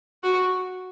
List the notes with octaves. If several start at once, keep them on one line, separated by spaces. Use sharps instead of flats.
F#4